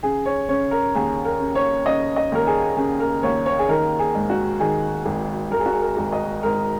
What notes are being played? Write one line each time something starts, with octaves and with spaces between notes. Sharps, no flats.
C#3 G#4
C#5
C#3 C#5
A#4
D#2 G#4
A#4
C#3
C#5
C#3 D#5
D#5
D#2 A#4
G#4
C#3 G#4
A#4
D#2 C#5
C#5
G#4
D#3 A#4
G#4
G#2
F#4
D#3 G#4
G#1
G#1 A#4
G#4
F#4
G#4
A#4
G#1
D#5
G#2 A#4